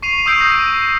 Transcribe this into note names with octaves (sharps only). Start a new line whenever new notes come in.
C#6 C7 D#7 F7
C#6 D#6 E6 G6 C7 D7
A#6